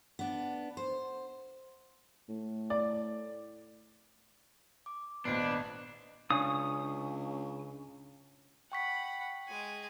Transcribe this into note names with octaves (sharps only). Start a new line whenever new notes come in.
B3 D4
C5
A2
D5
D6
G#1 A#2 B3 D4 B4 D#5 C7
C#2 C#3 D4 G#5 C#6 D#6
F#5 G5 B5 C#6 B6
G#3 G#5